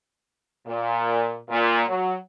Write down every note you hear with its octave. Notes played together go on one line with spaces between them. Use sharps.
A#2
A#2
F#3